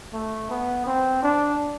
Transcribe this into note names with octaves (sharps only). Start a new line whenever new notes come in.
A3
B3
C4
D4